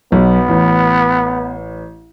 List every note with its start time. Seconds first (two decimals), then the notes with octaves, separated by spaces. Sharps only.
0.12 B1 B3
0.49 A1